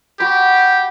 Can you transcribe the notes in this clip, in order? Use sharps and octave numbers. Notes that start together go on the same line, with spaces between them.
F#4 G4 B5